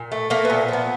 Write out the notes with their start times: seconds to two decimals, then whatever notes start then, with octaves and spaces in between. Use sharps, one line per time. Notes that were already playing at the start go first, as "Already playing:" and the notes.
Already playing: A#2
0.12 A3
0.30 A3 A#3
0.45 B3
0.50 A#2
0.68 F3 B3